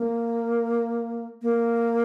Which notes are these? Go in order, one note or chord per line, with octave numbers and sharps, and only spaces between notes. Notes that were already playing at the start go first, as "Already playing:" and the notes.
Already playing: A#3
A#3